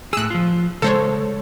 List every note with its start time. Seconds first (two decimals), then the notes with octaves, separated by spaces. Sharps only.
0.13 A2 G#4 E6 F#6
0.30 F3 F4
0.82 C#3 G#3 A4 C5 C#5